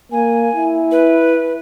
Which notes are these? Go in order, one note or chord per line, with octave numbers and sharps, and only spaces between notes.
A#3 G#5
E4
B4